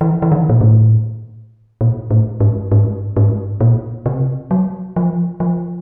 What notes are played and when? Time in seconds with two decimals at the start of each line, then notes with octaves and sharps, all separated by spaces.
0.01 E3
0.22 E3
0.32 D#3
0.49 A#2
0.61 A2
1.81 A#2
2.11 A2
2.40 G#2
2.72 G#2
3.17 G#2
3.61 A#2
4.06 C3
4.51 F#3
4.96 F3
5.40 F3